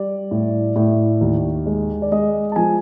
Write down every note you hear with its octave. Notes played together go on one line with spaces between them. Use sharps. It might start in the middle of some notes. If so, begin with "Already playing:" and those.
Already playing: G3 D5
A2
A2
D#2
G#3
D5
G#3 D#5
A5
F3 G#5